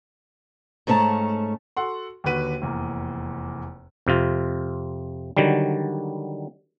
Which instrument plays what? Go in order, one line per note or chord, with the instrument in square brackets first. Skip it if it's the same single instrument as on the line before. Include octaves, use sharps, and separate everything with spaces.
[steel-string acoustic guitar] G#2 A3 C#4 B4 A5 A#5
[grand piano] F#4 A4 F#5 C6
D#2 D3 F#4 B4 D#7
F1 E2 A#3
[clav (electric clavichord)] F2 C3 F4
D3 D#3 F#3 G3